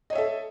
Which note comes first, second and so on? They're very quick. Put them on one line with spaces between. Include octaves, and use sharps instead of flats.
D#5 C#5 E5 A4